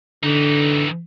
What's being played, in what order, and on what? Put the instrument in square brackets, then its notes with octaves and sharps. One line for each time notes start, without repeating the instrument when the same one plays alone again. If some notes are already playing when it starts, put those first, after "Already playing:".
[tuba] D3 [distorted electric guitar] E3 D#4